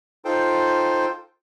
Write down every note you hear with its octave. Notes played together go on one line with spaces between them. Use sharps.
D#4 F4 A4 C5 G5